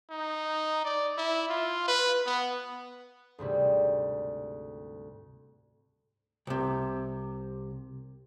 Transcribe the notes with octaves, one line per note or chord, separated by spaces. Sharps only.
D#4
D5
E4
F4
B4
B3
D2 G#2 C3 G3
C2 C3